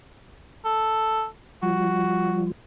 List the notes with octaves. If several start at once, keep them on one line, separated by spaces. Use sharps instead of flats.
A4
F3 G3 F4 F#4